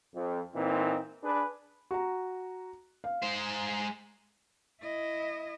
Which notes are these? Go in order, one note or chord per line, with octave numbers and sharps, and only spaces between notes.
F2
A#2 E3 C4 D#4
D4 G#4 B4
F#4 A#5
F5
G#3 C5
E4 D#5